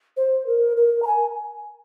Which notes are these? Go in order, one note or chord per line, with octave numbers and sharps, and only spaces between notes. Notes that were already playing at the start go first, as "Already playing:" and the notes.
C5
A#4
A#4
A#5
G#5